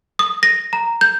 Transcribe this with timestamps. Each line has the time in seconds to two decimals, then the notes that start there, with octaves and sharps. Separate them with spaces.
0.19 D#6
0.43 A#6
0.73 A#5
1.01 G6